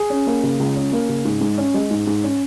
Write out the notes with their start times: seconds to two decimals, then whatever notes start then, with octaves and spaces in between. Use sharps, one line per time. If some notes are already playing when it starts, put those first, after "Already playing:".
Already playing: G#4
0.10 C#4
0.27 A#3
0.43 C#3
0.59 C#2
0.76 C#4
0.92 A#3
1.09 C#3
1.25 G#2
1.41 G#2
1.58 C#4
1.74 G#3
1.91 G#2
2.07 G#2
2.23 C#4